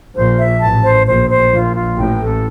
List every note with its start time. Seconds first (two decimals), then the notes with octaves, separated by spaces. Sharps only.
0.15 A#1 A#2 C5
0.38 E5
0.61 A1 A2 A5
0.84 C5
1.07 A#1 A#2 C5
1.30 C5
1.52 A#1 A#2 F4
1.75 F4
1.97 A1 A2 G5
2.21 A4